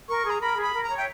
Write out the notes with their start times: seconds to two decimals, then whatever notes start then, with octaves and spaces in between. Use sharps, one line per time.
0.08 A#4 C#6
0.24 G#4
0.30 A#5
0.40 A#4 B5
0.57 G#4
0.62 B5
0.74 A#4
0.84 A#5
0.90 C#5
0.97 E5 G5